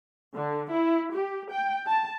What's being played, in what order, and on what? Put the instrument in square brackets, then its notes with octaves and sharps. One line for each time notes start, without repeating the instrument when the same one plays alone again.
[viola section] D3
E4
G4
G5
A5